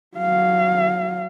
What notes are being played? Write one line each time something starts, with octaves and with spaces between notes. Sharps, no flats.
F#3 F5